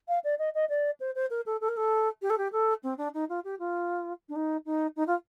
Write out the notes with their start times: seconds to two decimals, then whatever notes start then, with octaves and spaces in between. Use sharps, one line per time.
0.08 F5
0.24 D5
0.39 D#5
0.54 D#5
0.69 D5
1.00 C5
1.15 C5
1.30 A#4
1.46 A4
1.61 A4
1.68 A#4
1.77 A4
2.22 G4
2.30 A4
2.38 G4
2.52 A4
2.83 C4
2.98 D4
3.14 D#4
3.29 F4
3.44 G4
3.59 F4
4.29 D4
4.36 D#4
4.65 D#4
4.96 D#4
5.07 F4